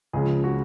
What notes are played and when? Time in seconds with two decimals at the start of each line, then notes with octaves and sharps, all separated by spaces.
0.13 C#2 C#3 F3 G#4
0.44 F#4